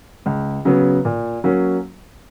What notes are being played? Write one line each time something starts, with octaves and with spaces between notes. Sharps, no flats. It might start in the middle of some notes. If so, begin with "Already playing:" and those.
C#2
C#3 F#3 B3
A#2
F#3 A#3 C#4